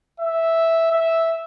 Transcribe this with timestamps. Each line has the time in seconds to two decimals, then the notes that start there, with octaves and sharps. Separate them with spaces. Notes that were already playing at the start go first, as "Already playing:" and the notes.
0.20 E5
0.92 E5